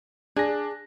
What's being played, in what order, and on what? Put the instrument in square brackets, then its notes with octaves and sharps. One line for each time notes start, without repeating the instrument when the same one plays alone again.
[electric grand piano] D4 A#6 [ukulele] G#4